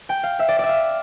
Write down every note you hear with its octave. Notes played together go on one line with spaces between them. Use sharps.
G5
F5
E5
D5
D5 E5
F5